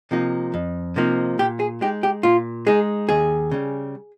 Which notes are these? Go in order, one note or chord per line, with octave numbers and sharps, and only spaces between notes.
C3 F3 A#3 D#4
F2
C3 F3 A#3 D#4
A#2 G4
G#4
G#3 D#4 G4
G4
A#2 F4
G#3 D#4 G#4
D#2 G#4
C#3 G3